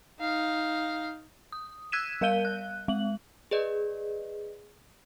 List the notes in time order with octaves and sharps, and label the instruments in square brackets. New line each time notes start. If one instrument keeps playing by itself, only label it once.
[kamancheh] D#4 F5
[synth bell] D#6
E6 F#6 G#6 B6 D#7 E7
G3 A#4 F5 G6 D#7 G7
F#6
G#3 F#7
[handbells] G#4 B4 D5 D#5